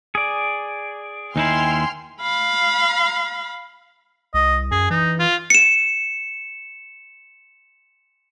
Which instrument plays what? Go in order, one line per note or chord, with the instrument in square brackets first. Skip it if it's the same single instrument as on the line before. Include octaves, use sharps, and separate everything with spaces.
[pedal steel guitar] G#4 D5
[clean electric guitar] D#2 D#4 E4 [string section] G5 C6 F6 [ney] G#5
[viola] F5 B5
[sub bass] C2 [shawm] D#5
[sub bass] F#2 [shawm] G#4
[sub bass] E3 [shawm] D#4
[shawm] F4
[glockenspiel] C#7 E7